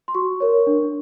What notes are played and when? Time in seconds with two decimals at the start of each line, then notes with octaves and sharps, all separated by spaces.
0.08 C6
0.15 F#4 C#6
0.40 A#4 C#5
0.67 D4